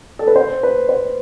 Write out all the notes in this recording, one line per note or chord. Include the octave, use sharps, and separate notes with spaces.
A4
B4
C5
B4
C5